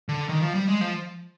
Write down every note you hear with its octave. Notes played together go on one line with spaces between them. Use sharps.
D3
D#3
F3
G3
G#3
F3